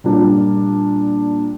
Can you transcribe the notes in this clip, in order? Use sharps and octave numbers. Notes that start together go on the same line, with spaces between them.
A#2 G3 A#3 D4